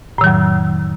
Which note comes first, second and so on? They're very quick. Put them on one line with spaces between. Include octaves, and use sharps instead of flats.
A2 D#3 F#3 F2